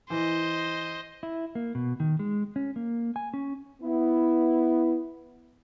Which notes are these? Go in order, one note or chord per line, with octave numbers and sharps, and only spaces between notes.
E3 C5 D#5
E4
A#3
B2
D#3
G#3
C#4
A#3
G#5
C#4
B3 E4